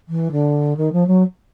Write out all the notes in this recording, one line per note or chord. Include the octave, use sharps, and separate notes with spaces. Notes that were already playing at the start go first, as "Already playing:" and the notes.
E3
D3
D#3
F3
F#3